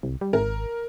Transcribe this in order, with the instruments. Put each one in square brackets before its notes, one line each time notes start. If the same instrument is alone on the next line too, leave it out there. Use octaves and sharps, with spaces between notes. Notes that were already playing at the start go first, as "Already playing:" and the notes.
[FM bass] C2
G3
[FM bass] G#1 [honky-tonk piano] A#4